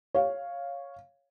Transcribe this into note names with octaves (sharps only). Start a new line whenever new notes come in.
C#5 F5